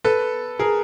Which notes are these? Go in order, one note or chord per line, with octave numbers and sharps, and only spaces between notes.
A4 B4
G#4 A#4